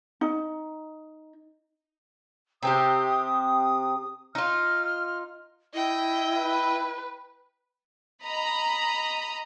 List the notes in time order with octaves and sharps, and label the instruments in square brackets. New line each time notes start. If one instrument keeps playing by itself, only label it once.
[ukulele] D#4
[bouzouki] C3 C4 G4 [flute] D#6
[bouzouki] D#4 F4 [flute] F6
[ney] E4 [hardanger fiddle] D#5 G5
[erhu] B4
[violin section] D#5 A#5 B5